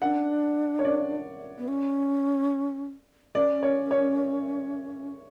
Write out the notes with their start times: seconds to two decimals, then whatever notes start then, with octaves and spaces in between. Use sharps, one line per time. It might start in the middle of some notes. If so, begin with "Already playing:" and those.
0.01 D4 F#5
0.79 C#5
0.85 D5
1.58 B3
1.68 C#4
3.35 C#4 D5
3.63 C#5
3.91 C#5